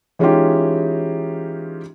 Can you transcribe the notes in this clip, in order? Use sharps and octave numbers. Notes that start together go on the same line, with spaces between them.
E3 G#3 C#4 D#4 F4 G4